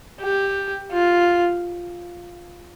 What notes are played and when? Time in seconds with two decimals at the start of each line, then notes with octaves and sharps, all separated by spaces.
0.21 G4
0.92 F4